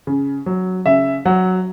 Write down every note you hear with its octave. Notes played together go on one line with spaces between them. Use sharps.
C#3
F#3
C#3 E5
F#3 F#5